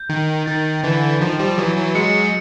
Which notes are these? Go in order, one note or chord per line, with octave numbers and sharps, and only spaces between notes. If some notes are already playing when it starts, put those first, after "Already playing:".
Already playing: G6
D#3
D#3 A6
D3 E3
D#3 F3
F3 G3
E3 F#3
E3 F#3
F#3 G#3 C#7